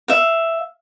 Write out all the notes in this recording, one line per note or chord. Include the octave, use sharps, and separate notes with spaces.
E5 F5